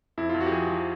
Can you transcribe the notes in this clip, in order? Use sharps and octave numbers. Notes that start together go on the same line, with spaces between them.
F2 E4
F4
F2
F#4
G4
F3 G#4
F3